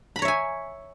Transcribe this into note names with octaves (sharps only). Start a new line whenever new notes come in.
C#5 E5 G#5 A#5 B5